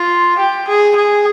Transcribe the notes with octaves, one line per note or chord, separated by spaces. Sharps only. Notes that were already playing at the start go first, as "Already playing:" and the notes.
Already playing: F4
G4
G#4
G#4